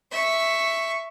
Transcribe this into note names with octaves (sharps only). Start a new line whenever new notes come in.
E5 C#6